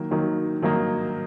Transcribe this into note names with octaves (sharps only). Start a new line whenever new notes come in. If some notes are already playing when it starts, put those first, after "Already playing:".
Already playing: D#3 F#3 A#3 D#4
D#3 F#3 A#3 D#4
D#3 F#3 A#3 D#4